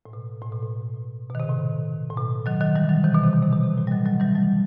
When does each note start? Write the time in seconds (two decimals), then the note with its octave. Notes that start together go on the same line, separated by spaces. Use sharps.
0.06 A2
0.13 B2
0.42 A2
0.52 B2
0.62 A2
1.30 B2 D#3
1.40 C3
1.49 A2
2.10 A2
2.17 B2
2.46 D#3 F#3
2.60 D#3 F#3
2.76 E3 G3
2.89 D#3 F#3
3.04 C3 E3
3.14 B2 D#3
3.23 C3
3.33 B2
3.43 C3
3.53 B2
3.63 C3
3.77 A2
3.87 G3
3.91 D#3 F#3
4.06 D#3 F#3
4.20 E3 G3
4.35 F#3 A3